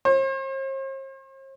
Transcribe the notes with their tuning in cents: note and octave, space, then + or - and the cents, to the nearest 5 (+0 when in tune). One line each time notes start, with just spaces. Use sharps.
C5 +45